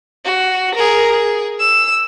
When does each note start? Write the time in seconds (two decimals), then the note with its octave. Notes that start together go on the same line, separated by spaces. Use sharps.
0.24 F#4
0.74 G#4 A#4
1.11 G#4
1.60 E6